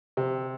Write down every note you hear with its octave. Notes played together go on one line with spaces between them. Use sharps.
C3